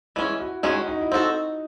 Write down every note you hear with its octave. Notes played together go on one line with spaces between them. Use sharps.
E3 G#3 C#4 E4
F#4
D#3 G#3 C#4 F#4 G#4
D#4
E4
C4 D#4 F#4 A4